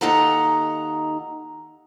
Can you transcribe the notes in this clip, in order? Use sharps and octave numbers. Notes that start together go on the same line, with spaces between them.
D#2 D#4 A4 F#5 A#5